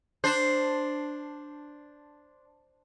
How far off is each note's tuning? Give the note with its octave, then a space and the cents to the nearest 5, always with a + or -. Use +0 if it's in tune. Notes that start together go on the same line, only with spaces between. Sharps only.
D4 +0 C5 +0